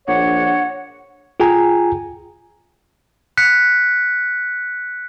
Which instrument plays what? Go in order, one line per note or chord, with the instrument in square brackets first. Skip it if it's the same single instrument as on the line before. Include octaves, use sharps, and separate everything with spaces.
[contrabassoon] A#1 [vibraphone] D4 G#4 [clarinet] C#5 [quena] F#5
[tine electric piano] F4 G#4 G5 G#5 A#5
[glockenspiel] F#6 B6 C#7